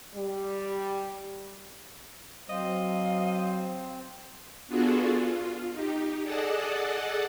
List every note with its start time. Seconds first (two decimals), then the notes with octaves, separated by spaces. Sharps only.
0.14 G3
2.49 F#3 C4 C5 D#5 F5
4.67 B3 D4 F4 F#4 G#4 A4
5.13 F4
5.72 D#4 G4
6.23 G#4 A4 D5 D#5 F#5 A5